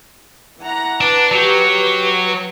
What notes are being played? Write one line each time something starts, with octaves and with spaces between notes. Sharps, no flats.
E3 F#5 A#5
D4 B4
F#3 G4